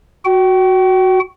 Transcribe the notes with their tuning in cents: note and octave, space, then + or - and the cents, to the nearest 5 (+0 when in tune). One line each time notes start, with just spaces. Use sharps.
F#4 +0 G5 -35